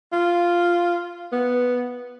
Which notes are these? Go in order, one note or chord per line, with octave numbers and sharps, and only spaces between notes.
F4
B3